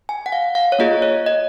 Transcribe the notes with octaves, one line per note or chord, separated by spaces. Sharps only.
G#5
F#5
F5
F5
C#5
A#3 F4 G#4 D#5
C#5
D#5